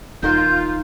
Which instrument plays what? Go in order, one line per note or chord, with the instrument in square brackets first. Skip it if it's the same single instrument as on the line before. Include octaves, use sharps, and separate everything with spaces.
[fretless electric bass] D#1 D#2 [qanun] D#4 A#4 C5 [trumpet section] F4 [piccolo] G6